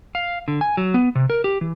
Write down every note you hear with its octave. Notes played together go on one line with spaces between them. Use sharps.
F5
D3
G#5
F#3
B3
C3
A#4
G4
E3